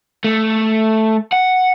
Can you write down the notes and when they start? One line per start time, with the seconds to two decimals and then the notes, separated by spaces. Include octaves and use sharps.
0.24 A3
1.33 F#5